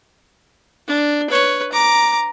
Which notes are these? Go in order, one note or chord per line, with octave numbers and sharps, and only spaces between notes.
D4
B4 C#5
A#5 D6